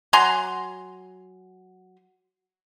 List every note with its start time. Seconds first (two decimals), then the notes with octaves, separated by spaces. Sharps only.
0.13 F#3 G#5 A#5 C6